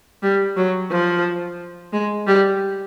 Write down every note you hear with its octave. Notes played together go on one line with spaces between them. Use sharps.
G3
F#3
F3
G#3
G3